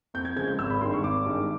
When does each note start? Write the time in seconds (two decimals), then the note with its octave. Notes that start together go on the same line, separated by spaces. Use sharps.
0.14 F2 G6
0.25 G#6
0.36 C#3 F3 G#3 G#6
0.48 G6
0.59 G#1 E6
0.70 B5
0.81 G2 D#3 G#3 C6
0.93 C#6
1.04 G#1 D6
1.26 G2 D#3 G#3